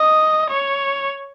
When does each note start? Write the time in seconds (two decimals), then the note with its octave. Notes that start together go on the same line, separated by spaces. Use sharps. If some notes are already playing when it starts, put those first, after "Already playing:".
Already playing: D#5
0.50 C#5